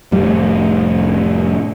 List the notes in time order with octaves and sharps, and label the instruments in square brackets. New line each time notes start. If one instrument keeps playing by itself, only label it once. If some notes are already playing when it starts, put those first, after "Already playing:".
[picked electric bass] F1 A2 G3